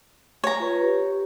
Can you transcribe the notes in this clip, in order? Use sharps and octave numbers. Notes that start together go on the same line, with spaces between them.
C#5 A#5
F4 B4
G4